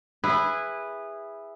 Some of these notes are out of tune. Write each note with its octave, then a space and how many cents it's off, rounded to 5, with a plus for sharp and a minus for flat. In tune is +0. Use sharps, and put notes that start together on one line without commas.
E4 +0 G#4 -20 B4 +0